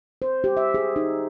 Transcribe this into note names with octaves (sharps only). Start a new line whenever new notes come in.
C5
G4
E5
G#4
D#4